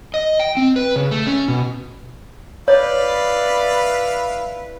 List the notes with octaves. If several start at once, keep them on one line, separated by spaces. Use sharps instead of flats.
D#5
G5
C4
B4
C#3
A3
C#4
B2
E4 B4 C#5 D5 F5